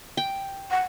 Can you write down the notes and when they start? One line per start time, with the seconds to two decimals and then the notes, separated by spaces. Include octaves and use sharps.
0.17 G5
0.71 F#5